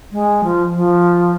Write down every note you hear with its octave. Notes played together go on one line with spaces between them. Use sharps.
G#3
F3
F3